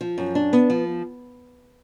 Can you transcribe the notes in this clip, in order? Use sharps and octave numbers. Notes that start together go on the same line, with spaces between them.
F3
F#2
D4
B3
F3